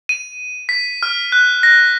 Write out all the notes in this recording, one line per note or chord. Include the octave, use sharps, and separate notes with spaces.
D#7
B6
F6
F#6
A#6